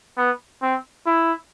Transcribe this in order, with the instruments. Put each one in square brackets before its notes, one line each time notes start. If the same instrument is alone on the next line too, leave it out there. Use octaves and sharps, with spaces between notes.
[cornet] B3
C4
E4